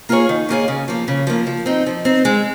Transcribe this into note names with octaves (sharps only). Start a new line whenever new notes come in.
A#3 F4 G#4 C#5
D#3
A#3 F4 G#4 C#5
C#3
F3 A#3
C#3
F3 A#3
F3
C4 D#4
F3
C4 D#4
G#3